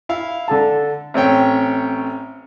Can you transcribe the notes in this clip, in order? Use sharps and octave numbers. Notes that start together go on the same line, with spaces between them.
E4 F5
D3 A4 A5
A1 C4 C#5 G5